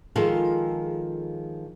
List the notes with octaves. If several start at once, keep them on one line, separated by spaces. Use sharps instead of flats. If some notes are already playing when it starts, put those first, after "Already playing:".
D#3 F3 G#3 F4 G#4 A4